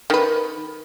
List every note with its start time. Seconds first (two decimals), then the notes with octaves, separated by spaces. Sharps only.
0.10 D#3 B4